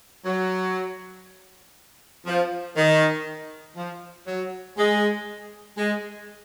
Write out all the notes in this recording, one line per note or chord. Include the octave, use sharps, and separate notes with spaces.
F#3
F3
D#3
F3
F#3
G#3
G#3